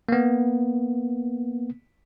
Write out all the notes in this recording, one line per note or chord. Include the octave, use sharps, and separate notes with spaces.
A#3 B3